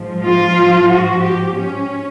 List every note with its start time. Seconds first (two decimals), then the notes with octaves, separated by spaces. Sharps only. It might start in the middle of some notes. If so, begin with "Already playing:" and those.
Already playing: G#2 F3
0.23 F4
0.89 F#4
1.22 G4
1.55 C#4